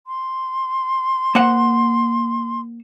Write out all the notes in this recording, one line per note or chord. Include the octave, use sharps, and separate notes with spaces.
C6
A#3 C5 F#5